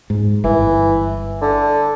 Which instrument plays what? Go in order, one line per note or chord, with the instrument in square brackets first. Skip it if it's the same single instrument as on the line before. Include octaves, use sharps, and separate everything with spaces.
[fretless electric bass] G#2
[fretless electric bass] G1 [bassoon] E3
[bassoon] D3